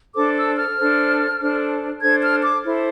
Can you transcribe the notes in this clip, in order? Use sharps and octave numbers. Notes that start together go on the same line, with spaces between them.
D4 A4 C5 D6
E6
F6
D4 A4 C5
D4 A4 C5
D4 A4 C5 G#6
F6
D6
E4 A4 C5